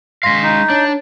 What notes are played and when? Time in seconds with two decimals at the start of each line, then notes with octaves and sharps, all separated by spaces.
0.23 G#3 F5 C6 A#6 B6
0.43 D#4
0.70 D4 C#5